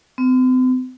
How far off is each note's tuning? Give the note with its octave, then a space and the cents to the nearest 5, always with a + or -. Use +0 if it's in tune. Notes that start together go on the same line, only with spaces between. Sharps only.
C4 -45